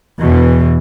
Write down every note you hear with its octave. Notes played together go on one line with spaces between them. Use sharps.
E2 B2 E3